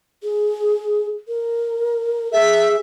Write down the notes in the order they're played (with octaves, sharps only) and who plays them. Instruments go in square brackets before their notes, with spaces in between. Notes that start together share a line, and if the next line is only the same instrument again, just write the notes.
[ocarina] G#4
A#4
[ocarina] G#4 [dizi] E5